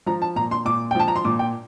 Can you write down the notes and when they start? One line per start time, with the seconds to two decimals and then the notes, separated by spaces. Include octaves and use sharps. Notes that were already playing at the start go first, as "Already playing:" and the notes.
0.06 F3 A#5
0.22 A5
0.36 A#2 A#5
0.51 C6
0.65 A#2 D6
0.91 G5
0.95 F3 A5
1.08 A#5
1.16 C6
1.25 A#2 D6
1.39 G5